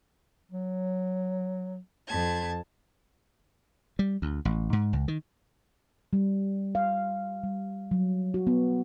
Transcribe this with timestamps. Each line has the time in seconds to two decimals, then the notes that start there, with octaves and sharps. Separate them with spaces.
0.52 F#3
2.06 F2 A5 G#6
3.99 G3
4.22 D2
4.45 A1
4.73 G#2
4.93 C#2
5.08 D#3
6.13 G3
6.75 F5
7.43 G3
7.91 F#3
8.34 F#4
8.47 B3